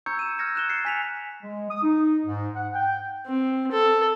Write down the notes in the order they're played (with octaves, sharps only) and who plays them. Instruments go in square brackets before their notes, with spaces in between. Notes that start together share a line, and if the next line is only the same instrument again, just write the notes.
[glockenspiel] A#5 C#6 E6 G6 G#6 C#7
D#7 E7
E6 F6 G#6 A#6 C#7 D#7
F#6 E7 G7
F#6 A6 C7 C#7
G#5 B6 F7
[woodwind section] G#3
D#6
D#4
G#2
F#5
G5
[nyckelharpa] C4
A4